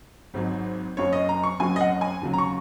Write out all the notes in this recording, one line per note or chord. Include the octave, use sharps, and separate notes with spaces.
G#1 G#2 F#3
F#1 F#2 F#3 C#5
D#5
A#5
C#6
F#1 F#2 F#3 G#5
D#5
F#5
G#5
D#2 C#3 F#3
A#5
C#6